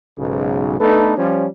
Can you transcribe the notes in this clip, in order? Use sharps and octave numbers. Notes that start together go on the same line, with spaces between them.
B1 G#2 C#3
A3 B3 D4 D#4 A4 B4
F3 G3 C#4